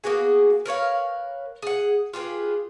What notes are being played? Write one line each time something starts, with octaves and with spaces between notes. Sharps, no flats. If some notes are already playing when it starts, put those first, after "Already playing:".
A#3 B3 F#4 G#4
A#4 B4 C#5 F5
G#4 F#5
F4 G4 G#4 B4